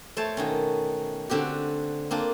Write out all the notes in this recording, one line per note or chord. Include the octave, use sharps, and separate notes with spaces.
A3 C5 C#5 A5
B2 D#3 C#4
D3 C4 F#4 G4
A#3 C4 D4 F4